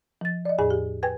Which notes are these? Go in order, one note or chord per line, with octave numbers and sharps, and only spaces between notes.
F3 A6
D5 D#5
E2 A2 G#4 G#5
G4
B4 G5 G#5 G#6